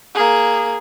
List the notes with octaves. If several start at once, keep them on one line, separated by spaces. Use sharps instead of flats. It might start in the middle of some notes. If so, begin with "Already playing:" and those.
A#3 G#4